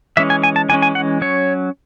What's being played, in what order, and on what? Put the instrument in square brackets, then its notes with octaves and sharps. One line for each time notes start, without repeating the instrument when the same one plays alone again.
[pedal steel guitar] E3 G#3 C#4 E5
G#5
G#5
A5
E3 G#3 C#4 G#5
G#5
F#5
F#3 C#4 C#5